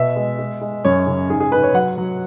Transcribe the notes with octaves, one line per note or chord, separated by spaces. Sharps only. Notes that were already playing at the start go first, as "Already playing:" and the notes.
Already playing: B2 E5
G#3
G#3
G#3
F#2 C#5
C#3
G#2 G#4
G#4
G#2 B4
C#5
F#3 F#5
F#3